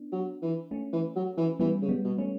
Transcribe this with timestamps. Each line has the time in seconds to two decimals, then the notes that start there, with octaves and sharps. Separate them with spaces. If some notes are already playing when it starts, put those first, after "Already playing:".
Already playing: B3 D4
0.12 F#3
0.42 E3
0.71 A3 C#4
0.93 E3
1.15 F#3
1.37 E3
1.60 E3 G3 B3
1.82 C#3
1.89 G3 B3
2.04 B2
2.19 A3 C#4